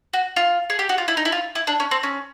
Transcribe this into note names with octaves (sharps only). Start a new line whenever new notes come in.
F#4
F4
G#4
G4
F#4
F4
E4
D#4
E4
F4
E4
D4
C#4
C4
C#4